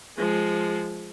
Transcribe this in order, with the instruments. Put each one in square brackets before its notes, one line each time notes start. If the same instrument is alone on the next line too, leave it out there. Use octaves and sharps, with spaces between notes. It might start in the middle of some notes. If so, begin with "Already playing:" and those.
[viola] F3 G#3